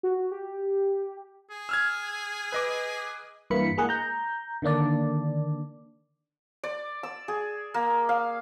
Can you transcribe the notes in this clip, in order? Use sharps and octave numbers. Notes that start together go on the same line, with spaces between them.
F#4
G4
G#4
E6 F6 G#6
B4 D#5 D6
G2 E3 A#3 B5 C#7
G#3 A#3 G#4 F#5
A#5 G6
D3 D#3 A#3 D4 D5
D5
E6
G#4
A#3
F5